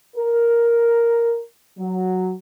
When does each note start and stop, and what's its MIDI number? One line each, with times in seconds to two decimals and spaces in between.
0.16 1.39 70
1.78 2.32 54